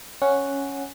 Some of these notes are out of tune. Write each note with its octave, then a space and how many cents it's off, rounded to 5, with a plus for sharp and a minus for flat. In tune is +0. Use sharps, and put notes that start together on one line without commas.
C#4 +0 F#5 +0